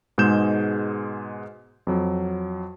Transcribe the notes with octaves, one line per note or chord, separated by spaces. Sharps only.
G#2 B2 G#3 G#4 G6 E7
F2 F#3